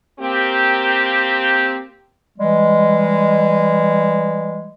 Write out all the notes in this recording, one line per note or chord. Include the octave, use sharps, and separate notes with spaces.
A#3 C4 G4
E3 G3 G#3